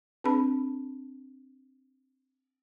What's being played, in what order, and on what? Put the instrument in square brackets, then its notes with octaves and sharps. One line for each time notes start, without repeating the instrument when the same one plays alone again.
[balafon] C4 D4 G#4 B4 A5 B5